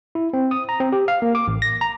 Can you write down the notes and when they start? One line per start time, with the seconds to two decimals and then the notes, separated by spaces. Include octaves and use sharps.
0.15 E4
0.33 C4
0.51 D#6
0.69 A#5
0.80 C4
0.92 G4
1.08 F5
1.22 A#3
1.35 D6
1.48 A1
1.62 A#6
1.81 A#5